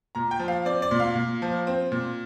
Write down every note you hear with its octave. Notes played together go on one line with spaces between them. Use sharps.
A#2 A#5
G5
F3
F5
C4 D5
D5
A#2
F5
A#2
F3
C4
A#2